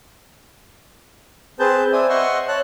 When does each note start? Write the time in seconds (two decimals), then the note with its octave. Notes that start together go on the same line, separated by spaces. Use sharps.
1.60 C4 G#4 B4 C5 A5 G6
1.93 C4 C5 D5 E5 G#5 D#6
2.09 D#5 E5 F#5 C6 C#6
2.48 C#5 A5 F#6